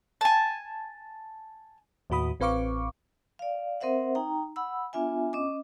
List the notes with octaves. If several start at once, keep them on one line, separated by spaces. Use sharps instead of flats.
G#5 A5
D#2 A2 F#4 B5 D#6
A1 C4 B4 F5 C#6 D6
D5 F5
C4 A#4 C5 E5 F#5
D#4 G5 A#5
F#5 B5 E6
B3 D4 F4 E5 G#5
C#4 D#5 D6